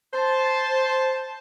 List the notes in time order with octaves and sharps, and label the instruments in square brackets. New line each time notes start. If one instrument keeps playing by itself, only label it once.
[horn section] C5 A5